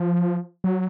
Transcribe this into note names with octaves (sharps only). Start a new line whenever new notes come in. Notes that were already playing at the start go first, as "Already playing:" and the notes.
Already playing: F3
F#3